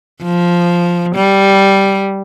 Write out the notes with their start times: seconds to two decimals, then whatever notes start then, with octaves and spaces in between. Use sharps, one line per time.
0.23 F3
1.15 G3